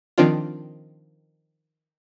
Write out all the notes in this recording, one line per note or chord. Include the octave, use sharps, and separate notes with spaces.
D#3 F3 C4 D4 F4